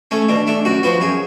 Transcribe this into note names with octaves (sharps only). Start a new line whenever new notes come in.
A3 C#4
B2 D4
A3 D4
F#2 F#4
F3 B3 F#4
F#2 G#4